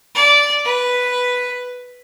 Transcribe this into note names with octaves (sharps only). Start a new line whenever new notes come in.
D5
B4